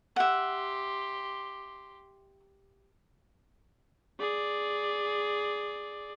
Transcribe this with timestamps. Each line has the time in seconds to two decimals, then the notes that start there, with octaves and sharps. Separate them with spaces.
0.16 G4 E5 F#5 C6
4.20 G#4 D5